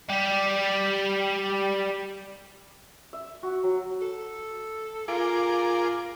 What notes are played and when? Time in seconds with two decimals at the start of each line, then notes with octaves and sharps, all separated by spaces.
0.09 G3 G4
3.13 E5
3.43 F#4
3.63 F#3
4.02 A4
5.08 F4 G#4 A#4 D6